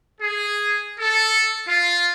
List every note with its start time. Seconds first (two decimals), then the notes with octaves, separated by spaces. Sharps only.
0.21 G#4
1.00 A4
1.67 F4